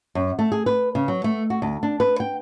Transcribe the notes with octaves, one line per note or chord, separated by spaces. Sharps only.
F#2
A3
G#4
B4
C#3
F#3
A3
F#4
D2
D4
B4
G5